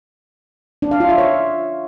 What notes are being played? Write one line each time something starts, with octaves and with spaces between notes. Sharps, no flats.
D4
F5
F4
E5
C#5